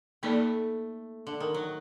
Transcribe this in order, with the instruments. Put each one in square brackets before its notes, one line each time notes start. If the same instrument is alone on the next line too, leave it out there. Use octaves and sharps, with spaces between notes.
[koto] A3 [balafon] A#3 D#4 A4 D5
[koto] D3
D#3
F#3